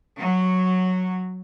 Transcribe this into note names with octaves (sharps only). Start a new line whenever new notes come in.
F#3